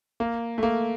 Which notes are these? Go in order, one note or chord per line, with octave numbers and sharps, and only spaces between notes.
A#3
A3
A#3